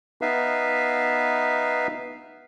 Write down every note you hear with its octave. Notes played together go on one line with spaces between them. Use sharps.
B3 D#4 B4 E5 F5